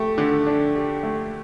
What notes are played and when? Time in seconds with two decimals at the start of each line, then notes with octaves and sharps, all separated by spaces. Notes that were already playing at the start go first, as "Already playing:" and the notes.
Already playing: A3 G4
0.18 D3
0.47 D4
0.76 G4
1.03 A3